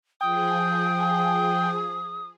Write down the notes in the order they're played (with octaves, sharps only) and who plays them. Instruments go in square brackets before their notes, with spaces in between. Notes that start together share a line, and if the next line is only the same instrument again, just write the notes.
[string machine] F3 G#4 [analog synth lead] G5 [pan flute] D#6